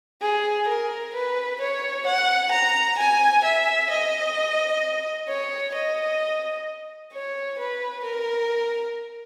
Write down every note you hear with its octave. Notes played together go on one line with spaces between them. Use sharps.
G#4
A#4
B4
C#5
F#5
A#5
G#5
E5
D#5
C#5
D#5
C#5
B4
A#4